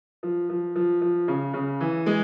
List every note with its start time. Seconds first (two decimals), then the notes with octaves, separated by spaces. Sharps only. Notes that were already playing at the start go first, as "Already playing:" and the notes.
0.23 F3
0.49 F3
0.76 F3
1.01 F3
1.28 C#3
1.54 C#3
1.81 E3
2.06 G#3